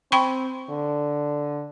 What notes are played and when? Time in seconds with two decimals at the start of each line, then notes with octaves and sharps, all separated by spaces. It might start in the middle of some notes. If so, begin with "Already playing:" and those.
0.12 C4 G5 B5 C#6
0.70 D3